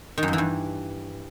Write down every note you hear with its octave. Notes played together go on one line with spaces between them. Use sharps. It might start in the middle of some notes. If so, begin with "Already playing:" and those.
D#3
F#2
F2
E3
G2